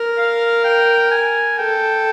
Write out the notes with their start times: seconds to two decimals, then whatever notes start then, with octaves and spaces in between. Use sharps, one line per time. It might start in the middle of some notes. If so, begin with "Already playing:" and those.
Already playing: A#4
0.17 F5
0.65 G5
1.11 G#5
1.58 A4 G5